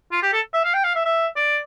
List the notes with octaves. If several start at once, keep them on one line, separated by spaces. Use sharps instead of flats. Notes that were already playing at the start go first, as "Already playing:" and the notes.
F4
G4
A4
E5
F5
G5
F5
E5
E5
D5